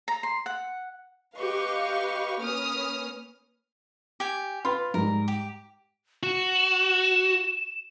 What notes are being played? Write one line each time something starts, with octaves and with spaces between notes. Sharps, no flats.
A#5
C6
F#5
G4 B4 D#5 F5 C#6
A#3 C#4 B4 D#6 F6
G4 G#5
F4 B4 B5 C6
G#2 G3 A#4
G4
F#4 E7